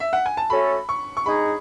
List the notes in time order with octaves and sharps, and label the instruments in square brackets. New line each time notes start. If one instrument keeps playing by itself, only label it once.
[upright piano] E5
F#5
G#5
A5
[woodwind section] A3 C#4 F#4 A4 [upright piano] B5
[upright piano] C#6
C#6
[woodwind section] G#3 D#4 G#4 [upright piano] B5